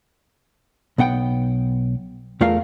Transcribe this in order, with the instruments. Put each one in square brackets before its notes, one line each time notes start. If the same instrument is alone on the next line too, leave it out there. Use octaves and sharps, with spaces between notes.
[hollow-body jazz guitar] B1 B3 F#5 G5
E2 A3 F4 A#4 F5